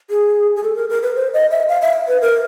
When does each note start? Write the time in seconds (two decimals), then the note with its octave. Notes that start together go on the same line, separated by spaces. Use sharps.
0.10 G#4
0.56 G#4
0.63 A4
0.76 A#4
0.90 A#4
1.02 B4
1.16 C5
1.34 D#5
1.51 E5
1.69 F5
1.82 E5
2.08 B4
2.22 A#4